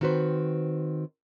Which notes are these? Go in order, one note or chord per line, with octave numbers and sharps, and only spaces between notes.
D#3 C4 F#4 B4 C5